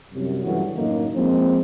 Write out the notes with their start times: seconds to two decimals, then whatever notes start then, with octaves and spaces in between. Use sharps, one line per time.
0.13 C2 F#2
0.43 C#2 G2 E3 F#3 A3 F#4
0.76 F#2 A2 D3 A#3 D#4
1.15 F3 G#3 A#3 C4